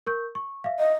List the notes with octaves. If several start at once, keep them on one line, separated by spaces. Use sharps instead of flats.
A#4 C#6 G6
C#6
E5 F5
D#5